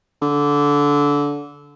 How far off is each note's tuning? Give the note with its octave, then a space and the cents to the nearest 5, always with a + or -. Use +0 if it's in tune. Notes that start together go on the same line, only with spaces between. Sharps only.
D3 -20